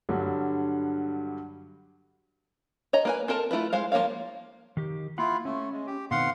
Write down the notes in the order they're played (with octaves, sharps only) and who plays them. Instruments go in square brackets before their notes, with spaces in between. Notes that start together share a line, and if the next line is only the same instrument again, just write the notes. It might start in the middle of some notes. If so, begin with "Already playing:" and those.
[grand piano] G2 D3 F#3 G3
[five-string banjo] C#5 D#5 A#5
A#3 B4 G#5
C4 A4 A#4 A5
A3 E4 F4 B4
G#3 C5 F5
F3 A#3 F#4 C#5 F5
[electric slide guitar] D#3 G4
[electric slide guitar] A#3 F5 F#5 [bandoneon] E4 F4
[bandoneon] A3 [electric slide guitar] C#4
[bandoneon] G#3
G4
[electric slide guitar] B2 D#3 C4 [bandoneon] F5 F#5 C6